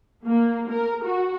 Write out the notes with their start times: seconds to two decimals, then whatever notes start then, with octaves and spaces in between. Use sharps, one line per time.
0.25 A#3
0.70 A#4
1.04 F#4